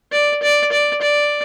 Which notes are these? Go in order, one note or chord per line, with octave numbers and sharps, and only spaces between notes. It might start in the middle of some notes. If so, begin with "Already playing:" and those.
D5
D5
D5
D5